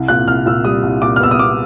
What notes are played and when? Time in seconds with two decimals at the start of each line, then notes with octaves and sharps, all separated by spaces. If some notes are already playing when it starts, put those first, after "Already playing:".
Already playing: C2
0.08 A#2 F#6
0.28 C2 F6
0.46 A#2 E6
0.65 G3 D#6
0.83 C2
1.02 A#2 D6
1.16 F6
1.20 B3 E6
1.31 D#6
1.39 B3 D6